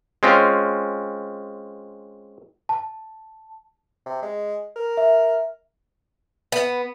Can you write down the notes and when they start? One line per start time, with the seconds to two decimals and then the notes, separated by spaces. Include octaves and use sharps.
0.23 G#3 C4 C#4 F4
2.69 A5
4.06 C3
4.22 G#3
4.76 A#4
4.97 E5
6.52 B3